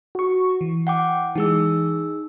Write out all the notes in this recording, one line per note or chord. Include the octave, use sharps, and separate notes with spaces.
F#4 C#6
E3
F#5 G5 D6
E3 G#3 D#4 G#4 E6